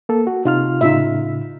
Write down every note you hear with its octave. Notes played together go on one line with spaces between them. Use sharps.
A#3 A4
F#4
C3 D#4 F4 F6
A2 C#3 D#4 F4 E5